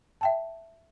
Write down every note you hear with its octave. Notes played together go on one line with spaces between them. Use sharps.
E5 G5 A5